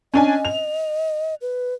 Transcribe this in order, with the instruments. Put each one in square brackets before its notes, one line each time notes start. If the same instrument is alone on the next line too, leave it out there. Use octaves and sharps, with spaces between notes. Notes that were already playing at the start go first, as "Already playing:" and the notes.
[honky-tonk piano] C#4 D4 G#5 [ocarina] D#5
[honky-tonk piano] F7
[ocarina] B4